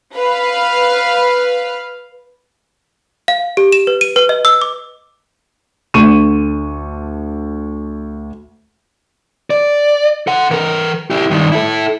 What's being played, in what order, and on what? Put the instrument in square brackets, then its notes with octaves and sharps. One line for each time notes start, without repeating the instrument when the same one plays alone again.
[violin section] B4 F5
[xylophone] F5
G4
E7
B4
D#7
B4
D#5
E6
D6
[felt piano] D2 D4 C#6 D#7 E7
[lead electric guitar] D5
A4 F#5
E3 A#4
E4 G4
G2 D#3
E4 A4